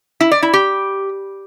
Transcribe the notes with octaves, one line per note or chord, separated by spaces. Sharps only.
E4
D5
E4
G4